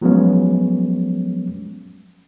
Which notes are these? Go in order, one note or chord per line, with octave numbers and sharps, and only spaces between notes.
F3 F#3 G#3 B3 C#4